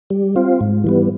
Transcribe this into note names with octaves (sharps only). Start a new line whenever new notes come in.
G3
C4 F4
G#2
E3 G3 B3